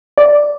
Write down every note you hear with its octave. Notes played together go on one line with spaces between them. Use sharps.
D5